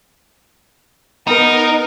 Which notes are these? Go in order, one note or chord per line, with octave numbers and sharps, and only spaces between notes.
B3 D#4 A#4